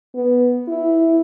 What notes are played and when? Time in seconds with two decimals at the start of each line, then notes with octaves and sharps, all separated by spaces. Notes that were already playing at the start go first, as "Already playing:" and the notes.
0.15 B3
0.68 E4